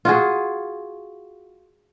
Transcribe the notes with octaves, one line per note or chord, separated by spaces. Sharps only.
F4 F#4 G#4